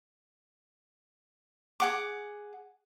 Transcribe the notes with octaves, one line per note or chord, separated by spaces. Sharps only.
G#4 F#5 D6